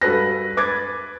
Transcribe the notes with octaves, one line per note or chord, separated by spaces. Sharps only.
G2 F#4 A4 B4 A#6
B4 D6 G#6 A6